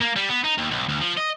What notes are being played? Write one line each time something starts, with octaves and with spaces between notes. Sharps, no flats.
A#3
G3
B3
D#4
D#2
B1
D2
F3
D#5